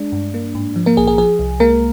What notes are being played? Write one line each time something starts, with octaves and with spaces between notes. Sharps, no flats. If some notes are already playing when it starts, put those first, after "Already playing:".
Already playing: G#3 D4
G2
A#3
G#2
F3
A#3 A#4
A#1 G#4
G#4
F3 G#4
C2
G#3 A#3 A#4